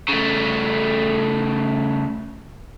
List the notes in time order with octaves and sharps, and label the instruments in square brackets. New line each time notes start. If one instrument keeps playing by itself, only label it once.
[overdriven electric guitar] C#3 A3